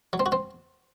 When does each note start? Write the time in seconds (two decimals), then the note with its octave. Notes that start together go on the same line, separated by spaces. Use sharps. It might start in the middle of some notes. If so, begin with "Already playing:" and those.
0.13 F#3
0.20 C4
0.26 F#4
0.32 C4